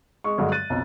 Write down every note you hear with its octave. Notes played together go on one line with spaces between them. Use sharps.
G#3 C#6
G2 D3 F#3 G#3
F#6 A6 D#7
B1 F2